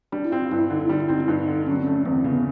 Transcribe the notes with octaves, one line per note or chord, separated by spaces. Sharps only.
G3 D4
E4
C4 F4
G2 E4
D3 D#4
E4
G3 D#4
E4
C4 D#4
E4
G2 D#4
D3
F#3 C#4
C4
A3 C#4
E2 C4
C#3 B3